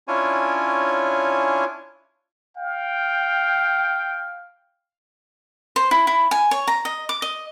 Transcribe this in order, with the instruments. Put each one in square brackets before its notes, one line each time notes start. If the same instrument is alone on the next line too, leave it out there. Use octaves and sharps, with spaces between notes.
[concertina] C#4 D4 E4 F4 C#5 G#5
[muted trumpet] F5 [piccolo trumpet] G5
[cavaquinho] C5
E4
E4
G#5
C#5
A#5
D#5
D6
D#5